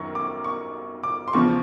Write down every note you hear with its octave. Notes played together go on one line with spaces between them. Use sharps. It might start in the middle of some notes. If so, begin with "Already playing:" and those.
Already playing: F#2 D#3 F#3 C#6
D6
C#6
D6
C6
E2 C#3 F3 C#6